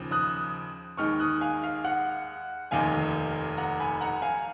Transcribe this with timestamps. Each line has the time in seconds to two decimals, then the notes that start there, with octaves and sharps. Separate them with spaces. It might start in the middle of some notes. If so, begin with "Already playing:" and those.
Already playing: D#2 C#3 F3
0.11 D#6 F#6
0.97 D#2 D#3 G#3 C#6 F6
1.19 D#6 F#6
1.41 F5 G#5
1.64 F5
1.85 F#5
2.71 F1 D#2 D#3 F5 G#5
3.57 F#5 A#5
3.80 G#5 B5
4.01 F#5 A#5
4.22 F5 G#5